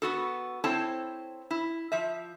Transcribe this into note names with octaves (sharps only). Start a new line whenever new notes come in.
B3 F#4 A4
C4 E4 A4 C5 C#5 A5
E4
F3 E5